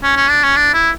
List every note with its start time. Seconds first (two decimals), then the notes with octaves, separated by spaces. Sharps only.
0.03 C#4
0.16 C#4
0.29 D4
0.43 C#4
0.56 D4
0.74 E4